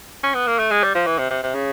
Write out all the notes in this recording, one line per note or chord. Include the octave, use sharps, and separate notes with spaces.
C#4
B3
A#3
A3
G#3
G3
F3
E3
C3
C3
C3
C#3